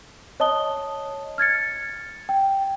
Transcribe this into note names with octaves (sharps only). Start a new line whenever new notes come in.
C#5 D#5 A5 D#6 G7
F6 G#6 A6 C#7
G5